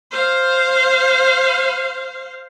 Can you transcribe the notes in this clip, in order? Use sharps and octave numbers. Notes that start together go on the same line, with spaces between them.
C5 F5